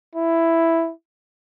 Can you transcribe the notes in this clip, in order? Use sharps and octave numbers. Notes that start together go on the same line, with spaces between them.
E4